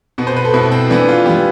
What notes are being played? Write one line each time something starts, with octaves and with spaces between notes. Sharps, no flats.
B2 B3
C5
B4
A4
B2 B3 E4
C4
E3 B3 D4
F4
E3 B3 G4